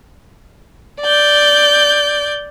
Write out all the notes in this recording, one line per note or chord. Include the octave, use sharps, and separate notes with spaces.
D5 G6